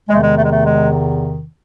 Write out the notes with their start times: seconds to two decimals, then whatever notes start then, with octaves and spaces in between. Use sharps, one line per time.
0.08 E2 C3 D#3 G#3
0.15 A3
0.22 G#3
0.37 A3
0.44 G#3
0.52 A3
0.65 G#3